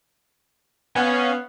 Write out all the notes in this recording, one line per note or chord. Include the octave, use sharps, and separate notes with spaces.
B3 C#4 F5 G#5